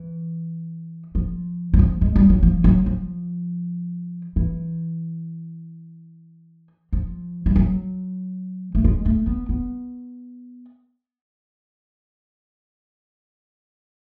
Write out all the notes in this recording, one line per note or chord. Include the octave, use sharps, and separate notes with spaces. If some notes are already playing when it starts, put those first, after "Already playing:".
Already playing: E3
F3
F#3
F3
G#3
G3
F#3
F3
F#3
F3
E3
F3
G3
F#3
A3
G#3
A3
B3
B3